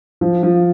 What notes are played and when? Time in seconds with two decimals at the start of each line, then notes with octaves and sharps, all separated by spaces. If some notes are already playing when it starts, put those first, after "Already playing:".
0.21 F3
0.43 F3